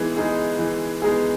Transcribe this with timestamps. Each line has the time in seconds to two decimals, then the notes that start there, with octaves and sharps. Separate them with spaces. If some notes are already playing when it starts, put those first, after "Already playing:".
Already playing: E3 G#3 B3 D#4 G#4
0.17 G#3 B3 D#4 G#4
0.59 E3
1.02 G#3 B3 D#4 G#4